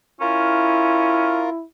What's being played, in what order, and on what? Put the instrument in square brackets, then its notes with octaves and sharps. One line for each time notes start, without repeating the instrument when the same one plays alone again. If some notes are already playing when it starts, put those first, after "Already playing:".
[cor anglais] C#4 [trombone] E4 [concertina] F4 A#4